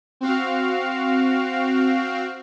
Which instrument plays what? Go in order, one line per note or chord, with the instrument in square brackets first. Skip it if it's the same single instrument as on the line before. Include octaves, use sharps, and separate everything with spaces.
[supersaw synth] C4 F#4 F5